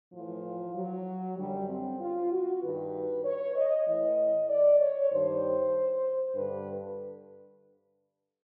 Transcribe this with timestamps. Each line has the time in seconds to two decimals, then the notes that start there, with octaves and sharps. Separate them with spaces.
0.13 A2 E3 F3
0.75 F#3
1.38 F#2 D3 G3
1.69 C4
2.00 F4
2.31 F#4
2.62 G2 D#3 B4
3.24 C#5
3.55 D#5
3.86 A2 E3 D#5
4.49 D5
4.80 C#5
5.10 G2 D#3 C5
6.35 G2 D3 B4